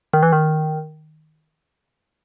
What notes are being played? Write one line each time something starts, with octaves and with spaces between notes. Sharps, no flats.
D#3
E3
D#3